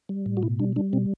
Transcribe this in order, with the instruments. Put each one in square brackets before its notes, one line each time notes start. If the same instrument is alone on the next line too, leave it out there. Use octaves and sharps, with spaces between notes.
[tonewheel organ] G3
A2
F#4
B2 E4
G3 D4
G3 D4
B2 C4